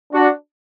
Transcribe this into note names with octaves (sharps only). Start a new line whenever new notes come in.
D4 F#4